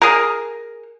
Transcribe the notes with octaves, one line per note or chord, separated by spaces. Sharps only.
G#4 A#4